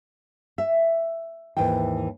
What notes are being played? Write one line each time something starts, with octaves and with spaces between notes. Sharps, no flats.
E5
D#2 G#2 E3 B4 G5